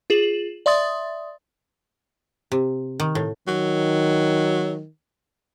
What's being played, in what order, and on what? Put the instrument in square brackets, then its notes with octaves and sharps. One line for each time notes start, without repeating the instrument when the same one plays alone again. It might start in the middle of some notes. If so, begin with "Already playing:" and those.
[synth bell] F4 G#4 E7 F#7
D5 E5 C6 D#6 A6
[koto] C3
D#3
A2
[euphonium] D#3 [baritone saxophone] F#3